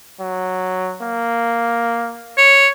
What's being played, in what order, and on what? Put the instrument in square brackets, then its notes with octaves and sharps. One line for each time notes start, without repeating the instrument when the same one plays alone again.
[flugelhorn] F#3
A#3
[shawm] C#5